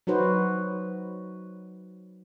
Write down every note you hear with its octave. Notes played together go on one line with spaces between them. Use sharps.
F#3 D#4 F#4 B4 C5